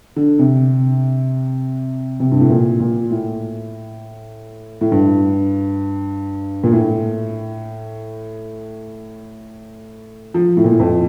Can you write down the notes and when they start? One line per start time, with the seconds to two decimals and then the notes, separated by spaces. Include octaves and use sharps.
0.16 D3
0.39 C3
2.20 C3
2.31 G2
2.41 A2
2.50 A#2
2.80 A#2
3.11 A2
4.81 A2
4.92 G2
6.64 A#2
6.72 A2
10.34 F3
10.57 A2
10.64 A#2
10.72 A2
10.80 F2